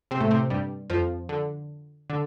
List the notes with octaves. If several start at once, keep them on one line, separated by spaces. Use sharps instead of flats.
C3 C4
A2 A3
C3 C4
G2 G3
F2 F3
D3
D3